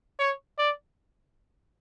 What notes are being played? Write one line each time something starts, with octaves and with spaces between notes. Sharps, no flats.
C#5
D5